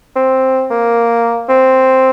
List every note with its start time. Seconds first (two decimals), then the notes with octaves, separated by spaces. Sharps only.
0.16 C4
0.70 A#3
1.49 C4